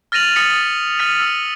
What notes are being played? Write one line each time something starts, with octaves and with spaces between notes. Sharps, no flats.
F6 A6 A#6 D#7 F7 F#7
D#6 F6 A6 B6 C#7
F6 A6 B6 D#7
E6